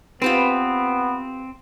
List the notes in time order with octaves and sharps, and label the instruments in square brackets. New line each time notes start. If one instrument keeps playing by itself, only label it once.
[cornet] B3 [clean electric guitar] C4 [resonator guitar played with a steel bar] F4 G4 B4